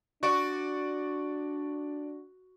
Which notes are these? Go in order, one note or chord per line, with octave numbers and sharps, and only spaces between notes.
D4 F#4 D5 C#6